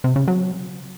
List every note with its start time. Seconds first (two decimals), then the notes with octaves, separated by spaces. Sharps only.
0.04 C3
0.16 C#3
0.28 F#3